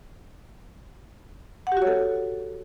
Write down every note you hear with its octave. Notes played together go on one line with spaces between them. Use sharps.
F#5
G4
F#4
C#5
A4